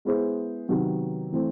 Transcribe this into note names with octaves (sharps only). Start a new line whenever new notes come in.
G#3 B3 E4 G#4 C5
C3 D#3 F#3 B3
E3 A3 C4 E4